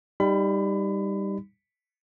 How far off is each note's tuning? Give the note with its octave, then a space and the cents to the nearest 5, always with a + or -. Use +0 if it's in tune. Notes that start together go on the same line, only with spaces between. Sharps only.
G3 +5 D#4 +0 B5 +30